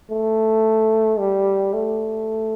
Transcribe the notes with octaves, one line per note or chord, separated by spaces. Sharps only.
A3
G3
A3